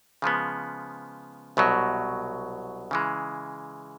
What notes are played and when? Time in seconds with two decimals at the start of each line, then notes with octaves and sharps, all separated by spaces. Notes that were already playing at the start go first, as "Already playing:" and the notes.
0.22 C#3 F3 G#3 B3
1.57 C2 B2 F#3
2.91 C#3 E3 G#3